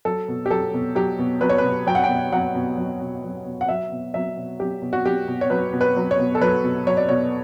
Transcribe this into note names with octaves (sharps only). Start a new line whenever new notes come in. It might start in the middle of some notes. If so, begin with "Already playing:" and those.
F#3 A4
B2
G4
F#3 A4
B2
F#3 G4
B2
F#3 B4
C#5
B4
B2
F#3 G5
F#5
G5
B2
F#3 F#5
B2
F#3
B2
F#3
B2
F#5
F#3 E5
B2
F#3 E5
B2
F#3 G4
B2
F#4
F#3 G4
B2
C#5
F#3 B4
B2
B4
F#3
C#5
B2
A4
F#3 B4
B2
F#3 C#5
D5
B2 C#5